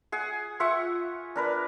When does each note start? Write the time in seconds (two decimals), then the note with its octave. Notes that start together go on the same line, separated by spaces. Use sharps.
0.12 G#4 F#5
0.60 F4 E5 F#5 C#6
1.36 D4 A#4 B4